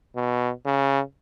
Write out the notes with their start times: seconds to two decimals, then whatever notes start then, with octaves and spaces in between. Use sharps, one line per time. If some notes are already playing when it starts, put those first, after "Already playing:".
0.16 B2
0.65 C#3